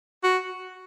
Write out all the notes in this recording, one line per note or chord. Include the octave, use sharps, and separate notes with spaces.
F#4